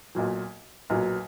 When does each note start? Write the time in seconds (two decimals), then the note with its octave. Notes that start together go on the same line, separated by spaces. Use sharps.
0.15 B1 A#2 F#3
0.90 B1 A#2 F#3 B3